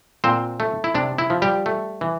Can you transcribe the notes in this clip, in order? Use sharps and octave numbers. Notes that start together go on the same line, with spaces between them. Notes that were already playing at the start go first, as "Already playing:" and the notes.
A#2 C4 C5
A3
E4
C3 D4
E4
F3
G3 G4
A3
E3